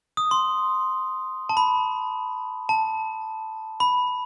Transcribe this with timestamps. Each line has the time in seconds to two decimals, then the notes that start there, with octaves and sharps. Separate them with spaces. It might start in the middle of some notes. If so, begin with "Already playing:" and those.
0.17 D#6
0.31 C6
1.49 A5
1.57 B5
2.69 A5
3.80 B5